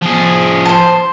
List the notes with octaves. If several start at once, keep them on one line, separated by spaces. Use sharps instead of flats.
F3 G#4
C5 A5